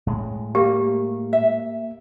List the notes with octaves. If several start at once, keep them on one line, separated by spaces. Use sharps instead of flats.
A2 G#3
A#3 G4
E5